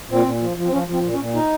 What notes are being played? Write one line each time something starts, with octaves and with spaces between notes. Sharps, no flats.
A#2 C4
A#2
F3
F3
C4
F3 C#4
F3
C4
A#2
C#4
A#2
D#4